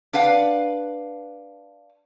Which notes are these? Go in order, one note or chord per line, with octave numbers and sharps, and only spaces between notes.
D4 B4 F5 F#5